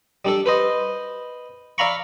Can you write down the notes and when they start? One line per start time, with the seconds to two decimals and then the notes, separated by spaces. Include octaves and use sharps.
0.25 G3 D4 A4
0.46 B4 C5 D#5
1.78 D5 E5 F5 A#5 B5 C#6